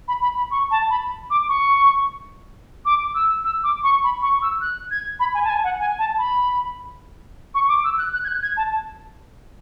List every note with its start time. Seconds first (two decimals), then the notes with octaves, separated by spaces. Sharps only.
0.08 B5
0.22 B5
0.37 B5
0.51 C#6
0.71 A5
0.90 B5
1.30 D6
1.49 C#6
2.85 D6
3.15 E6
3.45 E6
3.64 D6
3.83 C#6
4.04 B5
4.22 C#6
4.42 E6
4.61 F#6
4.91 G#6
5.20 B5
5.34 G#5
5.44 A5
5.49 G#5
5.64 F#5
5.79 G#5
5.99 A5
6.18 B5
7.55 C#6
7.69 D6
7.84 E6
7.98 F#6
8.13 F#6
8.24 G#6
8.28 F#6
8.42 G#6
8.57 A5